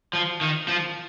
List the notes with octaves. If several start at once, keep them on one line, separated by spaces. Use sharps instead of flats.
F3
D#3
F3